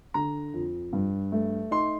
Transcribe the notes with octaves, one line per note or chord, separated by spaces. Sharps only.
D3 A#5
F2
G2
A3
D#4 C6